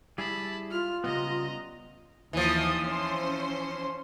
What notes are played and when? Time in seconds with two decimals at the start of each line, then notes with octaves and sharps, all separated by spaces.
0.18 G3 E4 G#4 A5 B5
0.71 F4 F6
1.04 C#3 G3 B3 D#5 A#5
2.33 D#2 E3 F3 D#6
2.86 C#4 C5 C6